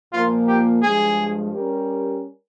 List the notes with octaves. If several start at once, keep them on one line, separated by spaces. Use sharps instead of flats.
A#2 F3 A#3 F4
G4
G2 F3 G#3 G#4
G3 C#4 G4 A#4